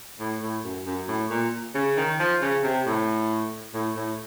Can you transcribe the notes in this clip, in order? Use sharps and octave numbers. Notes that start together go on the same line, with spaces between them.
A2
A2
F#2
F#2
A2
A#2
C#3
D#3
F3
C#3
C3
A2
A2
A2